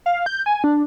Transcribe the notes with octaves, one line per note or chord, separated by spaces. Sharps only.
F5
G6
G#5
D4